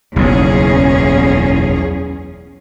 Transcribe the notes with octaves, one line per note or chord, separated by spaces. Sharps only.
F#1 B1 E2 C#4 G#4